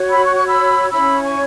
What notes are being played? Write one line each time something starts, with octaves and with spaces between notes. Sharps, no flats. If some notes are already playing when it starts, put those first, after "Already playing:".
Already playing: F#4 C#5
B5 E6
C#6 F#6
C#6 F#6
B5 E6
C#4 E4 C#5 B5 E6
G#5 C#6